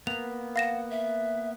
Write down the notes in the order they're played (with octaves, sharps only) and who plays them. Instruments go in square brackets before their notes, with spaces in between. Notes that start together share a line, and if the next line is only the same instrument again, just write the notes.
[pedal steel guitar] A#3 B3 [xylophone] F7
[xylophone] F5 A#6 E7 [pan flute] F#5
[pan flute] E5